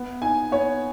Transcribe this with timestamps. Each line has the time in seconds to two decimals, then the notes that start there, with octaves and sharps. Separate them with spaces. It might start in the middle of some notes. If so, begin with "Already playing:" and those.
Already playing: B3
0.22 D#4 G#5
0.52 B3 C#5